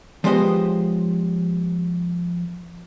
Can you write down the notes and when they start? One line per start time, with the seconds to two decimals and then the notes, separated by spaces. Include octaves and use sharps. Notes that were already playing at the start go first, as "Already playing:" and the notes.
0.24 F3 G#3 B3 G4 C5 D#5